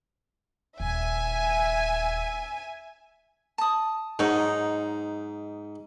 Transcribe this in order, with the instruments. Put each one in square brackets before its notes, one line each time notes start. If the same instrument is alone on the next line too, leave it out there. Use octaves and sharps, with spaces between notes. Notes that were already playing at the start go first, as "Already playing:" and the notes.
[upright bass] D#1 [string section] E5 G#5
[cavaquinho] A5 D#6
[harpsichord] G#2 [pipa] F#3 D#4